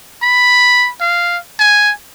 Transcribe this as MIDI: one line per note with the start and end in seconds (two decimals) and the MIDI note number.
0.22 0.90 83
1.00 1.38 77
1.60 1.92 80